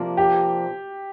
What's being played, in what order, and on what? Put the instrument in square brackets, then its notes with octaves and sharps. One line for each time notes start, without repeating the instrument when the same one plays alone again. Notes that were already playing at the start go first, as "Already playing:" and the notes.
Already playing: [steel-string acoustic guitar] C3 F3 A#3 D4
[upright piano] G4